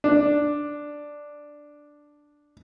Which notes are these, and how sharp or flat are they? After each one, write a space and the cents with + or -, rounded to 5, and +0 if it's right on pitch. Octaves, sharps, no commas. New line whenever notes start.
D4 +0